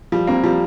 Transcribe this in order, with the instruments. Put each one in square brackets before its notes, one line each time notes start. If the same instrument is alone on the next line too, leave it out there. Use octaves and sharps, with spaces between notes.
[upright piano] F3 [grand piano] G3
[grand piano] A#3 [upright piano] C4
[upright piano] F3 [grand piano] G3